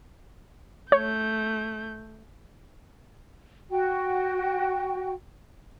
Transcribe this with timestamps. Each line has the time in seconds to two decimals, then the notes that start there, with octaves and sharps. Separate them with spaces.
0.92 A3 C#5 G6
3.71 F#4 G5